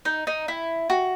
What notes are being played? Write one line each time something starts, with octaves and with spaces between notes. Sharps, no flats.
D#4
D#4
E4
F#4